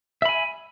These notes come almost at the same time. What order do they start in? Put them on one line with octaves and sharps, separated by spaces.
E5 B5 G#5